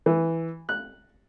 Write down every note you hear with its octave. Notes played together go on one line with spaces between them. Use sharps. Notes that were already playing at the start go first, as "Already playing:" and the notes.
E3
F#6